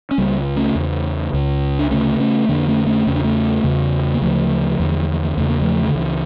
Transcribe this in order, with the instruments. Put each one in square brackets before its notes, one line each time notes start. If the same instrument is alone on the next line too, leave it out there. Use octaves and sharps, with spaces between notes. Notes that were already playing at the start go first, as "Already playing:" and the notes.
[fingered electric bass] C#4
C#2 C#3 G3 A#3
A3 C#4
E2 C#3
C#2 C#3
D4
D2 C#3 A3 C#4
A3 C#4
F2 D3 A#3 D4
A3 C#4
A3 C#4
E2 C#3 C#4
D4
A3 C#4
E2 C#3
A#3
D2 C#3 F3 A3
E2 D3
E2 C#3 A3
A#3
F3 A3
D3
C#2 C#3 E3